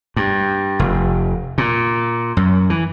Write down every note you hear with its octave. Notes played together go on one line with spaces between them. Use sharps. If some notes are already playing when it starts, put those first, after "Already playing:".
G2
F1
A#2
F#2
E3